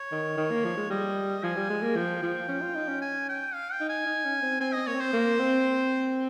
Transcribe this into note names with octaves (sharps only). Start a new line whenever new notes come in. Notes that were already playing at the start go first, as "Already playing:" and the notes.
Already playing: C#5
D#3
D#3
A#3
F3
G#3
G3 D#5
F3 G#5
G3
G#3
A#3
F3 G5
F3
C#4
F4
D#4
C#4
G#5
G5
F5
G5
D#4
G#5
D#4
C#4
C4
C4 G#5
C4 D#5
A#3 C#5
C4
C5
A#3
C4